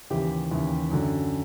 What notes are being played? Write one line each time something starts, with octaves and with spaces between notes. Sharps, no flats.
D#2 C#3 E3 G4
D#2 C#3 E3
F#2 D3 F#3